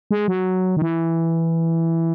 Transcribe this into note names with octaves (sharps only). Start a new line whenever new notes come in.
G#3
F#3
D#3
E3